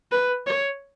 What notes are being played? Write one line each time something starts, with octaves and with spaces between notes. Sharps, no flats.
B4
C#5